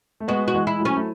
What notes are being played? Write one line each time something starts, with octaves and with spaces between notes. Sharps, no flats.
A3
G#3 B3 F#4
F#4
E3 G#3
E4
F#3 A3
C#4
A3